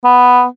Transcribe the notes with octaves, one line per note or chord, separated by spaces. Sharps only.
B3